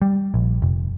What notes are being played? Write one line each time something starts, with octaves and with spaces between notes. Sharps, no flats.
G3
A#1
F1